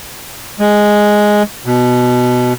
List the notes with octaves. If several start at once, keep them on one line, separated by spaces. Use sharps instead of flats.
G#3
B2